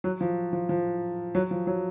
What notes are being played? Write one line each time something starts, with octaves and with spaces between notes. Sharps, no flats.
F#3
F3
F3
F3
F#3
F3
F#3